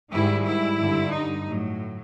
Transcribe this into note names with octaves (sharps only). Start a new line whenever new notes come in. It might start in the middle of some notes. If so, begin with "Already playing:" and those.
G#2 D#3 G3 E4
E4
G2 D3 G3
D#4
A2 F#3